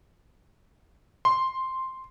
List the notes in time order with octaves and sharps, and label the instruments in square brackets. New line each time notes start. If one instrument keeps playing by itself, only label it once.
[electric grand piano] C6